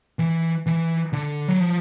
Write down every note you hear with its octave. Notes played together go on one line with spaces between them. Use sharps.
E3
E3
D3
F#3
F3